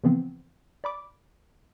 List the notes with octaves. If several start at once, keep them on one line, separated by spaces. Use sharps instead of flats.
C#3 E3 F3 B3 C4
D5 B5 D6